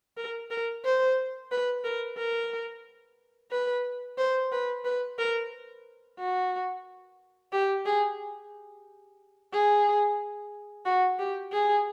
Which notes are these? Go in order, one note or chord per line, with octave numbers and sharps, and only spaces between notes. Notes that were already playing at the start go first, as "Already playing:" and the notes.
A#4
A#4
C5
B4
A#4
A#4
B4
C5
B4
B4
A#4
F#4
G4
G#4
G#4
F#4
G4
G#4